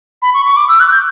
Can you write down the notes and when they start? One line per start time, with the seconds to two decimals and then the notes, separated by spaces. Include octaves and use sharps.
0.22 B5
0.34 C#6
0.45 C#6
0.56 D6
0.68 E6
0.80 F#6
0.91 G6